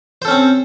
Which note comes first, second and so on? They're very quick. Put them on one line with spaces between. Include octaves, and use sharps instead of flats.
C5 A4 C#4 C4